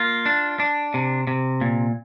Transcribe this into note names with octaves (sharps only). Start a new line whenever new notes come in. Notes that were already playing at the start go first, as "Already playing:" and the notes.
Already playing: A#3 F4
D4
D4
C3
C3
A#2